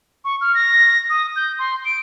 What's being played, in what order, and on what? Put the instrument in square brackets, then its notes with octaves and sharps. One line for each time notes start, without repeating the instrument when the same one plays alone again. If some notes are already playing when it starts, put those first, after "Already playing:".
[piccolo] C#6
F6
A#6
D#6
G6
C6
D7